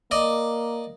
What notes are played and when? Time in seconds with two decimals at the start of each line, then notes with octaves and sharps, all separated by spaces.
0.11 A#3 D5 D#5